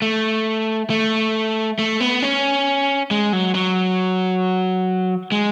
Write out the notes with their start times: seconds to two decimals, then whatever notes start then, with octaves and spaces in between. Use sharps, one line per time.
0.02 A3
0.90 A3
1.79 A3
2.00 B3
2.22 C#4
3.11 G#3
3.33 F#3
3.55 F#3
5.32 G#3